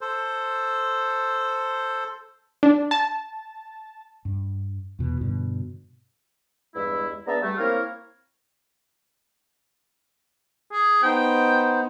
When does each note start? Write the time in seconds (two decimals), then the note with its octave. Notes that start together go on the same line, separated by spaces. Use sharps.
0.01 A4 C5
2.63 D4
2.91 A5
4.25 G2
4.99 E2 B2
5.21 G2 B2 D3
6.75 E2 G2 G#3 E4
7.27 B3 D4 G#4 E5 A5 A#5
7.42 G3 A3
7.58 A#3 C4 E4 A#4 C#5 F5
10.72 G#4
11.03 B3 D#4 C5 G5